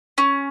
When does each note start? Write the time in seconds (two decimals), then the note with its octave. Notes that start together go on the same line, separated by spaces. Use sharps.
0.18 C#4